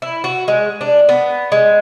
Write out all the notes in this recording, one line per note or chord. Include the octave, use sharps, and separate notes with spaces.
E4
F#4
G#3
D4
B3
G#3